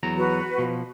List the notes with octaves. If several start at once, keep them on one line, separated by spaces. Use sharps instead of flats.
E2 F#3 A#5
F#4 B4
B2 F3